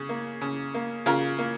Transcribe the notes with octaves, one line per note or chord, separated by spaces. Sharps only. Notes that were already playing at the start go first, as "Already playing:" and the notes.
Already playing: C#3 G#4
A#3
C#3
A#3
C#3 F4 A#4
A#3